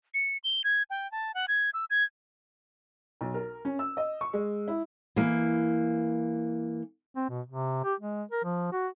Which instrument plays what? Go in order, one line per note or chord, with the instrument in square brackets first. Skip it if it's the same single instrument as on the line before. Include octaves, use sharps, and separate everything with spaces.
[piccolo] C#7
G7
G#6
G5
A5
F#5
G#6
E6
G#6
[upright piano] B1
A#4
C#4
E6
D#5
C#6
G#3
E4
[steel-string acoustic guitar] E3 A#3
[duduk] C4
B2
C3
G4
G#3
A#4
F3
F#4